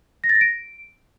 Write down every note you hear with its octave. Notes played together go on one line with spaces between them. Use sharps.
A#6
A6
A#6
D7